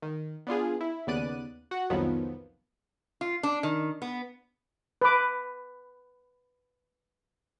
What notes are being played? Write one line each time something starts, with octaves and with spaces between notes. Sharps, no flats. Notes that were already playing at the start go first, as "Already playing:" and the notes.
D#3
B3 D4 F4 G#4
E4
D#2 C#3 B3 D5 F#6 D#7
F#4 F#5
C2 F2 D#3 F3 F#3 B3
F4
D4
D#3
B3
B4 D6